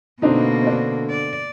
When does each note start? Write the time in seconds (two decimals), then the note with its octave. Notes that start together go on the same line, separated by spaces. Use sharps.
0.22 B2 D3 A#3 C4 D4 D#4
0.63 C4 D4
1.09 D5